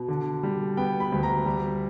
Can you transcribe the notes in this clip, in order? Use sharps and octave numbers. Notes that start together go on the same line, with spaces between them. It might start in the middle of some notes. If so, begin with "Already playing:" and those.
Already playing: B2
D3
G3
B3 G5
B5
D2
A#5
G3